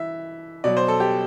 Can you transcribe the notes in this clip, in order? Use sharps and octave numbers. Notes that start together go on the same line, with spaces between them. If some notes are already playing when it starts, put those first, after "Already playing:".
Already playing: E3 E5
B2 F#3 D5
C5
A4
G4